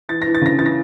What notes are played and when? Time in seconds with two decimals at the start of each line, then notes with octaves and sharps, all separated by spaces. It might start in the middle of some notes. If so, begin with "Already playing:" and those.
0.09 E3 A6
0.22 E3 A#6
0.34 A6
0.42 C#3 A#6
0.58 E3 A6
0.66 A#6